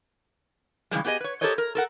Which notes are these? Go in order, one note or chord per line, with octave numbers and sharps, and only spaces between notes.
C#3 E3 G3 G#3
B3 G4 G#4 C#5 D#5
B4 C#5
G4 A4 A#4 C5 C#5 D#5
A#4
A4 A#4 F#5